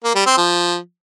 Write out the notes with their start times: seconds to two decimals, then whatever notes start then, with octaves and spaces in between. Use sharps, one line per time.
0.04 A#3
0.15 G3
0.26 C4
0.37 F3